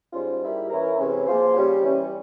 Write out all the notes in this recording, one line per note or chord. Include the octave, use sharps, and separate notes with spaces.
G#2 G3 C#4 F4 C5
G#2 G3 A#3 E4 G4
E3 A#3 C#4 E4 A#4
C3 E3 G#3 C#4
F3 A#3 F4 G#4 C5
C#3 G3 C#4 G4
E3 G3 C#4